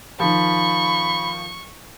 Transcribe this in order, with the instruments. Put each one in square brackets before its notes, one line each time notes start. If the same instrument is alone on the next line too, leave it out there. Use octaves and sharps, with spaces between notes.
[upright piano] D#3 F3 [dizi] B5 [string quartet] C#6